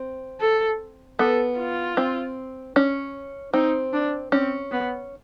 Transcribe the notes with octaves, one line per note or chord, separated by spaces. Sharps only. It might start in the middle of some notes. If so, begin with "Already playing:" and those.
Already playing: C4
A4
B3 A4
F4
C4
C#4
C4 D#4
D4
C4 C#4
B3